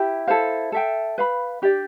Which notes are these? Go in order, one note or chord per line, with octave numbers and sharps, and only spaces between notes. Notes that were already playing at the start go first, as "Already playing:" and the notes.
Already playing: E4 G4 G5
E4 A4 C5 F5
A4 E5 G5
B4 F5 B5
D4 G4 D5